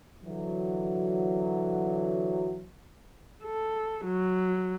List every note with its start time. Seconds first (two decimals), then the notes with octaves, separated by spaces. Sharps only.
0.24 D3 E3 F#3
3.43 A4
4.04 F#3